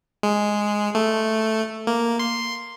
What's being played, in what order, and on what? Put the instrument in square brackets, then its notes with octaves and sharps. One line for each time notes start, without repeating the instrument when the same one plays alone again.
[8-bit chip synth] G#3
A3
A#3
C6